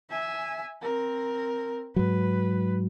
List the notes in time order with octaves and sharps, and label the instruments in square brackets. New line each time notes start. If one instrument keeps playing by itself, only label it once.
[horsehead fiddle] E5 G#5
C4 A#4
[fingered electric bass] G#2 F#3 [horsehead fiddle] B4